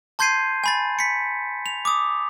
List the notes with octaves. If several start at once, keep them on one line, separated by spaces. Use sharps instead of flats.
A5 C6 G6 G#6 C7 D#7
G#5 B5 A6
B6 C#7
F7
D6 D#6